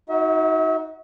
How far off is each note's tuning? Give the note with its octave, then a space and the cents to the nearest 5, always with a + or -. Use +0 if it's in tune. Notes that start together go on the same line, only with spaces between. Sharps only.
D#4 +25 F#4 +0 E5 -40